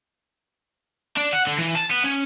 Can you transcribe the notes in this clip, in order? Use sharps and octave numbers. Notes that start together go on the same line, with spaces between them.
D4
F#5
D3
E3
A5
B3
C#4